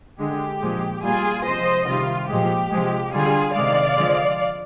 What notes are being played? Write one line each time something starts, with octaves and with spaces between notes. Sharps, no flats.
D3 G#3 G4
A#2 F3 G#3
A#2 G3 F4 G#4
C3 F3 G#3 C5 D#5
C3 D#3 G3 F4
A#2 F3 G#3 G4
C3 F3 G#3
D3 G3 F4 G#4
C3 D#3 G#3 D5 F5
D3 F3 G#3